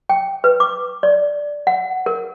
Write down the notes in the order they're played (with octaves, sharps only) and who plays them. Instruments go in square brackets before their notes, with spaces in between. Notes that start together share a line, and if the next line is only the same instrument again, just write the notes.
[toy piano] G5
B4
D6
D5
F#5
A#4